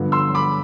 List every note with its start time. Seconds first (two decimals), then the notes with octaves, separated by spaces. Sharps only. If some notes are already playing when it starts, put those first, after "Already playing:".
Already playing: G2 D3 F3 B3
0.12 C6 E6
0.35 B5 D6